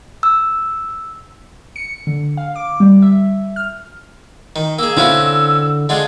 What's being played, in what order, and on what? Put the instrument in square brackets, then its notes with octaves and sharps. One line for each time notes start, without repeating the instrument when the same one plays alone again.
[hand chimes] E6
[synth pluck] C#7
D3
F5
D6
G3
E5
F6
[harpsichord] D#3
[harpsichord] A#3 G#4 [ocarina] E6
[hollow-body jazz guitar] D3 E4 F5 [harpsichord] C4 C#4 F#4
[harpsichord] D3 G#3 F4 [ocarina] F#5